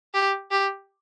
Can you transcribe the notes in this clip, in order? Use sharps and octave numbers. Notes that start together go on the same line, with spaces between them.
G4
G4